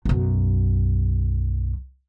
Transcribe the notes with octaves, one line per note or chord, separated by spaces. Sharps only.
B1 F#2